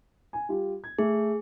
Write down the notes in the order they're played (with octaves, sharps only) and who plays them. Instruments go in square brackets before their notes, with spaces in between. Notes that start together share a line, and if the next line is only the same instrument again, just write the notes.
[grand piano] G#5
G3 F4 G4
G#6
[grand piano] A3 [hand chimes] G#4